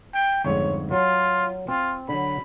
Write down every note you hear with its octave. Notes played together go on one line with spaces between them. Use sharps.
G5
G1 F2 G#2 C#5
F#3 F4
C4 F4
D3 F#3 B5